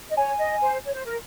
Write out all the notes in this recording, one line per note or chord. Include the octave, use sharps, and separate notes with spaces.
D#5
C#5 G#5
D#5
C5
C#5
C5
A#4